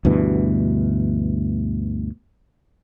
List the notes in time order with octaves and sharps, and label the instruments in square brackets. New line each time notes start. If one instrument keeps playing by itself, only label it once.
[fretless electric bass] D2 G2 B2 E3